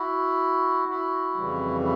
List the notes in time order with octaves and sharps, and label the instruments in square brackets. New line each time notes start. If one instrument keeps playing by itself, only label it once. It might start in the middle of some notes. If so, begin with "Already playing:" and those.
Already playing: [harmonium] E4 F#4
E4 F#4
F2 C#3 E3 G3
E4 F#4